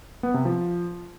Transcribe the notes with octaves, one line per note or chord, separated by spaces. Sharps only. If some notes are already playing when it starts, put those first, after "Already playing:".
B3
C3
F3